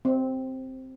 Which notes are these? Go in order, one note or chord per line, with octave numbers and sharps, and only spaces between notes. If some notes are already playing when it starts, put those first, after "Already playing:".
C4